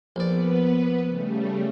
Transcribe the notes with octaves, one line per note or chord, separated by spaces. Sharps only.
A#1 B3 B4 D5
C#3 G3 A3